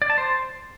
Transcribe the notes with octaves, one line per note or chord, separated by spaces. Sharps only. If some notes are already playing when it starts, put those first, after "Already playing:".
D5
A5
C5